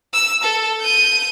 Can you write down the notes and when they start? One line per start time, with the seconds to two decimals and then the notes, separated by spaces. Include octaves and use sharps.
0.13 E6
0.43 A4
0.81 G6 D#7